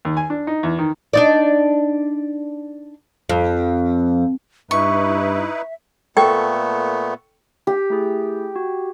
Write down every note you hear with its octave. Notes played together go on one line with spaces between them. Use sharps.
D#2
G#5
D4
D#4
E2
D#3
D4 D#4 D5
F2
G2 D#4 E4 B4 E5 C#6
A#2 A3 B3 A4 G5 C#6
G4
A3 E4 G#4
F#4